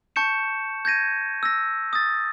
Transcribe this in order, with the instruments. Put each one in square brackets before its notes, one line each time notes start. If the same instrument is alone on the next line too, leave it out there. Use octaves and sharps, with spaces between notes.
[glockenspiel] A5 C#6 G6 C#7 E7
G6 G#6 A#6 D#7
E6 A#6
D#6 A6